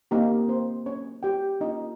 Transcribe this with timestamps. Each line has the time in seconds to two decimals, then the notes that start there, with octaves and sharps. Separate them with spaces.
0.11 A#3 C4 D#4 G4 A#4
0.48 C4 C5
0.86 C#4 C#5
1.23 G4 G5
1.60 A#3 C#4 D#4 F4 D#5